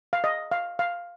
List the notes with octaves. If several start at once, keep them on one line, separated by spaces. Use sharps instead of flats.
F5
D#5
F5
F5